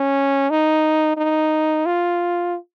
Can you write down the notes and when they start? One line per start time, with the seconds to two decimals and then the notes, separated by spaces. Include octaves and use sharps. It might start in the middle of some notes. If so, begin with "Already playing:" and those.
Already playing: C#4
0.50 D#4
1.17 D#4
1.86 F4